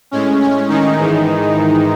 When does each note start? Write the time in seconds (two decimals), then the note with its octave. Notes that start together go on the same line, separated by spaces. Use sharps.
0.11 A2 G#3 C#4
0.40 C#4
0.69 D#3 D#4
0.98 G#2 E3 G#3